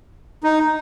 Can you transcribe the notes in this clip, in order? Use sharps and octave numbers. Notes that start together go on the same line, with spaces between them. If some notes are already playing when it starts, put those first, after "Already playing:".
D#4